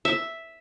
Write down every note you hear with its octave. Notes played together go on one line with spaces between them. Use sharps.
E5